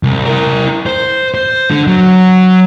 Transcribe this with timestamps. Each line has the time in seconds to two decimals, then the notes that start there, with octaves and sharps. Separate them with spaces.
0.03 C2
0.26 E4 A#4
0.86 C5
1.34 C5
1.71 D3
1.87 F#3